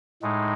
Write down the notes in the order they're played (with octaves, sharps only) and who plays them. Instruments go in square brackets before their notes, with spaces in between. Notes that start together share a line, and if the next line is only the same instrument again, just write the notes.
[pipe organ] A2 G#3 D#4